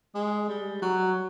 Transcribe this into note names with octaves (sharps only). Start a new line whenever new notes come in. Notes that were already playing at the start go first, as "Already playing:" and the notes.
G#3
G3
F#3